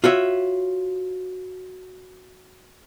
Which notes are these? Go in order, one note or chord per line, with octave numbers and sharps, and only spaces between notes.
F4 F#4 C#5 E5